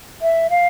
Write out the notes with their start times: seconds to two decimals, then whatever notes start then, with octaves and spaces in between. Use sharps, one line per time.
0.21 E5
0.49 F5